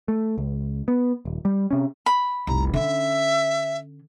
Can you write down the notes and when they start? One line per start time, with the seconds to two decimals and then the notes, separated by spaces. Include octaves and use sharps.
0.08 A3
0.38 C#2
0.88 B3
1.25 D#1
1.45 G3
1.71 C3 C#4
2.06 B5
2.47 F1 C2 A#5
2.74 D3 C#4 E5